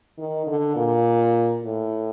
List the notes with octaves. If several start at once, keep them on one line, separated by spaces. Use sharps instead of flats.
D#3
D3
A#2
A2